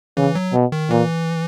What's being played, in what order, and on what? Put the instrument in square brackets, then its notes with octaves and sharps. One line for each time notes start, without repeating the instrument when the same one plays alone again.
[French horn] C#3 [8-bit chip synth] E3
[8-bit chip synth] F#3
[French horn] B2
[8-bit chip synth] D#3
[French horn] A#2 [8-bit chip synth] E3